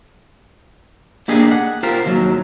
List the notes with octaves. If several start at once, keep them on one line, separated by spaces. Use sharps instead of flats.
A#3 D4 G4 G#4 D#5
F#5
F4 G4 A#4 C5
D#2 F#3